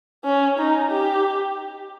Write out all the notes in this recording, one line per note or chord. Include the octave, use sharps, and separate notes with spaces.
C#4
D#4
G4